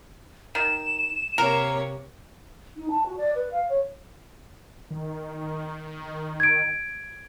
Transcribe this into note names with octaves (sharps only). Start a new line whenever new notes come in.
D#3 E7
C3 A#3 A#4 C#5
D#4
A5
F#4
D5
B4
F5
C#5
D#3
G#6 D7